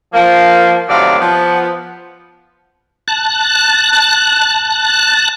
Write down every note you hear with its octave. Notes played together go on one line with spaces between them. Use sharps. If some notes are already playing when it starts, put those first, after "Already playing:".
F3 A#3
A2 C3 D#3 F#3 D5 F5
F3 B3
A5 F#6